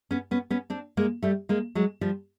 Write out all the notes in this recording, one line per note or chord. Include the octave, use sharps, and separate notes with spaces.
B3 C#4
B3 C#4
B3 C#4
C4 D4
G#3 A#3
G3 A3
G#3 A#3
F#3 G#3
F3 G3